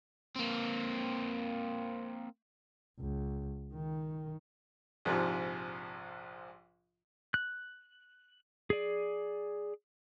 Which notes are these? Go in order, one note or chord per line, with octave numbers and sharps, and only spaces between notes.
A#3 C4
C#2
D#3
A#1 G#2 C3 F3
F#6
G#4 D5